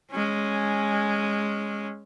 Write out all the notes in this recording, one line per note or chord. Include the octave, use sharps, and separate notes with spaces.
G#3 C#4